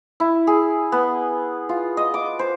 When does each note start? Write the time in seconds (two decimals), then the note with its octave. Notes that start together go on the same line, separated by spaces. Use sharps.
0.20 E4
0.47 G#4
0.92 B3
1.69 F4
1.97 D#5
2.14 D6
2.39 C5